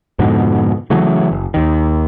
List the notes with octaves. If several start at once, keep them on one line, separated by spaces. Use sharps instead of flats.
F2 G#2 B2 D3
C#3 E3 F#3 A3
F#1
D#2 D#3